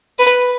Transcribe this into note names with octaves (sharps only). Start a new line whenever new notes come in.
B4